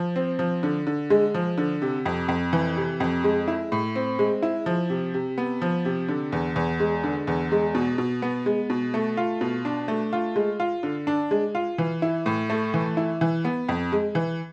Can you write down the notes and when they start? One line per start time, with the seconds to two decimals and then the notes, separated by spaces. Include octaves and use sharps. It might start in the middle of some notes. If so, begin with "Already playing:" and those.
Already playing: F3
0.16 C4
0.39 F3
0.63 D3
0.87 D3
1.10 G#3
1.34 F3
1.58 D3
1.82 C3
2.06 F2
2.28 F2
2.53 E3
2.77 C3
3.00 F2
3.24 G#3
3.48 E4
3.72 A2
3.95 C4
4.19 G#3
4.43 E4
4.66 F3
4.90 C3
5.14 C3
5.38 B3
5.62 F3
5.85 C3
6.09 D3
6.32 E2
6.56 E2
6.80 G#3
7.04 D3
7.27 E2
7.52 G#3
7.75 B2
7.98 B2
8.22 B3
8.46 G#3
8.70 B2
8.94 A3
9.17 F4
9.41 B2
9.65 D4
9.88 A3
10.13 F4
10.36 G#3
10.60 F4
10.83 D3
11.07 D4
11.31 G#3
11.55 F4
11.78 E3
12.02 E4
12.26 A2
12.50 A3
12.74 E3
12.97 E4
13.21 E3
13.45 B3
13.69 F2
13.92 G#3
14.15 E3